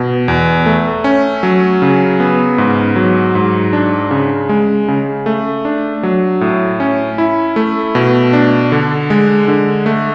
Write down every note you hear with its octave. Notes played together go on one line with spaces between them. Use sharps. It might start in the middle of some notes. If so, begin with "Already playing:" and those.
Already playing: B2
E2
A3
C#4
F#3
C#3
B3
G#2
F#3
G#2
D4
C#3
G#3
C#3
A3
D4
F#3
A2
C#4
E4
A3
B2
D4
D3
G#3
D3
A3